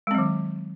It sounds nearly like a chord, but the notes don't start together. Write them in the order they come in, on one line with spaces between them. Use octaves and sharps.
G#3 C4 F#3 D#3